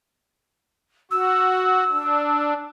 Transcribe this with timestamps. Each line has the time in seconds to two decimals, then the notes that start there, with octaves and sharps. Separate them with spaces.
1.11 F#4 E6
1.92 D4